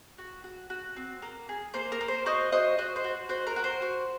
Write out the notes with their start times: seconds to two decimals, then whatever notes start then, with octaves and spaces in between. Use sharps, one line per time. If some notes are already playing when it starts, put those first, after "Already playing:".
0.18 F#4
0.44 F#4
0.70 F#4
0.97 C4
1.22 A#3
1.49 G#4
1.74 A#3 C5
1.92 A#4
2.01 A#3
2.08 C5
2.26 F#4 C5 D#5
2.52 F#4 C5 D#5
2.78 F#4 C5
2.96 C5
3.04 F#4
3.29 F#4 C5
3.47 A#4
3.56 F#4
3.64 C5
3.82 F#4